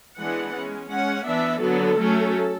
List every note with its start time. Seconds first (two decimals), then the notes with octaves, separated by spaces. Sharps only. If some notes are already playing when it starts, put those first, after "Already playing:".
0.19 E3 G#3 B3 D4 F#5
0.55 G#3 C#4
0.90 G#3 C#4 F#5
1.26 E3 B3 D4 E5
1.62 D3 F#3 B3 A4
1.98 F#3 A3 C#4